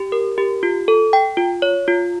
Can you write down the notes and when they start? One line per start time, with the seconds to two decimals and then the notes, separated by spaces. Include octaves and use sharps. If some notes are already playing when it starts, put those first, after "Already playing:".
Already playing: G4
0.12 A#4
0.38 G4
0.63 F4
0.88 A4
1.13 G5
1.37 F4
1.62 C#5
1.88 F4